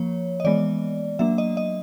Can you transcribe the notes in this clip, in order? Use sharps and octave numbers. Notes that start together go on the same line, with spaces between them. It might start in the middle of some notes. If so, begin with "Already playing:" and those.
Already playing: F3 A#3 C#5
D#5
E3 G#3 B3 D5
F#3 A#3 D4 E5
D#5
D#5